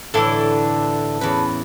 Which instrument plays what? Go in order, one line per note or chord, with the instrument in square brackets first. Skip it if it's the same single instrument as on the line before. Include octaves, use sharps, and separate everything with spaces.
[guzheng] A2 E3 [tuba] D3 [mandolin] D4 E4 A4
[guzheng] E2 B4 [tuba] C#4